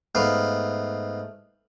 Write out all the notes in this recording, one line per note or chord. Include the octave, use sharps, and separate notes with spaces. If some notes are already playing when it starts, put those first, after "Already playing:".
G#2 A3 B3 F5